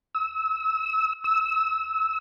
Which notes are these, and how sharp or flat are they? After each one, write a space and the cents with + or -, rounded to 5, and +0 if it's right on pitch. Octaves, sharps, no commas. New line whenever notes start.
E6 -30
E6 -25